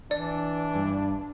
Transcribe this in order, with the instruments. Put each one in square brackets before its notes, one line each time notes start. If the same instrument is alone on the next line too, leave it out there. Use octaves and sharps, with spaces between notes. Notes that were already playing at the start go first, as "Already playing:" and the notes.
[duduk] E3 [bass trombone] D4 [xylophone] D5
[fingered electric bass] G2